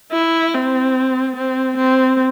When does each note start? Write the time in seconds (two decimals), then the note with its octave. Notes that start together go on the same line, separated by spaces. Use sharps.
0.12 E4
0.54 C4
1.36 C4
1.77 C4